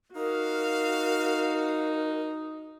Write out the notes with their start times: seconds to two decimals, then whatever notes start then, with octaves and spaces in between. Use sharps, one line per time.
0.16 D#4 F#4 A#4 F5